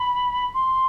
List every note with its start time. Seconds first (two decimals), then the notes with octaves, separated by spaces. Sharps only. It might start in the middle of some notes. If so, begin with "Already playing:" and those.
Already playing: B5
0.54 C6